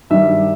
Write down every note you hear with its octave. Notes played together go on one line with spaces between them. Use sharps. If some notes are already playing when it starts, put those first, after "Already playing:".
G2 D#3 G3 E5